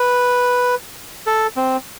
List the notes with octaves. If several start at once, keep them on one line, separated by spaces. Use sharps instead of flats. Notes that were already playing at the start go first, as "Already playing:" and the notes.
Already playing: B4
A4
C4